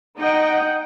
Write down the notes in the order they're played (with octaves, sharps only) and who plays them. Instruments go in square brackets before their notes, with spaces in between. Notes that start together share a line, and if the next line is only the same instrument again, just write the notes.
[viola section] D#4 D#5 F#5 G5